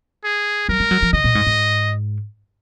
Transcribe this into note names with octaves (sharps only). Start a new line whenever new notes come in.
G#4
F#3 A#4
G#3
F#3
F3
C#3 D#5
A#2
G#2
G#2